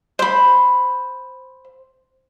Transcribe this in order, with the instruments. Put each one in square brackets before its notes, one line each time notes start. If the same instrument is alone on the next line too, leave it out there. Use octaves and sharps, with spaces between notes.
[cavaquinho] C5 B5